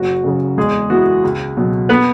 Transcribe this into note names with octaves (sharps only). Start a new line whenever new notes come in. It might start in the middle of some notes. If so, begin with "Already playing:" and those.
Already playing: F#1 F#4
F#2 C#3
E2 G#3 G#4
E3 B3 F#4
C#2
B2 F#3
B3 B4